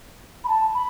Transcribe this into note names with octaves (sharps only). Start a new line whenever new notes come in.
B5
A5
B5